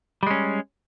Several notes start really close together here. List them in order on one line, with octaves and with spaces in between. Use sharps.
G3 G#3 C#4